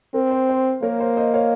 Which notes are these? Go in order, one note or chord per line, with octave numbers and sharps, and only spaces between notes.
C4 A#4
C5
C5
A#3 A#4 C#5
C5
C5 D#5
C#5 F5